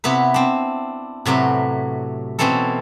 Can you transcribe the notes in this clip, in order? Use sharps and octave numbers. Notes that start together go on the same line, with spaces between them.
C3 B3 E4 B4
C4 D4
A2 C3 F#3 B4
B2 E3 C4 C#4 E4 A4